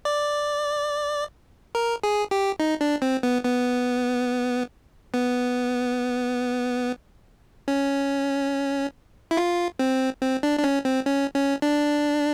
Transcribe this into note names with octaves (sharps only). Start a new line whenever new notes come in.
D5
A#4
G#4
G4
D#4
D4
C4
B3
B3
B3
C#4
E4
F4
C4
C4
D4
D4
C#4
C4
C#4
C#4
D4